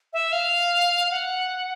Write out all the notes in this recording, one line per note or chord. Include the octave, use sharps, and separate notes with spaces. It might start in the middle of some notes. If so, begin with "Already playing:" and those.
E5
F5
F#5